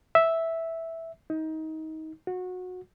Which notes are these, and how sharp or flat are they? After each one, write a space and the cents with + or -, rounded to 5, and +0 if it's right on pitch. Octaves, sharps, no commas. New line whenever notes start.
E5 -5
D#4 +25
F#4 -20